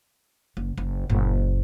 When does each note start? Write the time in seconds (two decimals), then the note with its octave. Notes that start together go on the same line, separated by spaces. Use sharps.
0.57 F#1
0.78 F#1
1.10 F#1 A#2